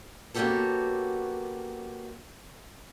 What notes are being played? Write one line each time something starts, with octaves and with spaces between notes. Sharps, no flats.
A#3 B3 C#4 F#4 G4 A4